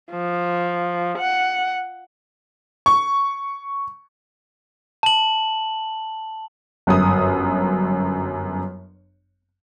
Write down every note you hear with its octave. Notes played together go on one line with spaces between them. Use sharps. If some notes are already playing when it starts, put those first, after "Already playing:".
F3
F#5
C#6
A5 F#7
G1 F#2 D#6